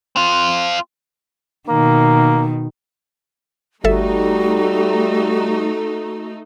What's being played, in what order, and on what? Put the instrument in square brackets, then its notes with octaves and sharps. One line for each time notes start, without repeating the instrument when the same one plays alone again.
[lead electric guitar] C4 F4
[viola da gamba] B2 D#3 [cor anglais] A#3
[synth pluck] G1 A4 E5 [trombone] G3 [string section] A3 D#4 [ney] F#4